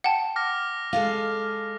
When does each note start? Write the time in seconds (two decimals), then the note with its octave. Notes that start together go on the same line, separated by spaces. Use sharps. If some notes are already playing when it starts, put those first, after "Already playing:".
0.04 F#5 G5 A5
0.36 D6 F6 A#6
0.93 G#3 A4 F5